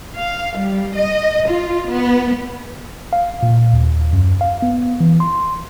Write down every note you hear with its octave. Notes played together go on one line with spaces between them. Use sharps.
F5
G3
D#5
F4
B3
F5
A#2
D#2
F#2
F5
B3
E3
C6